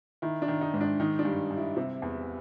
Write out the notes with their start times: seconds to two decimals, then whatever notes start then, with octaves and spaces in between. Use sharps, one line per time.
0.22 D#3 E4
0.42 D4
0.48 D#3
0.61 D#4
0.74 G#2
0.81 D4
1.00 D#3 D#4
1.19 D4
1.25 G2
1.51 G2
1.57 E4
1.77 C3
2.02 E2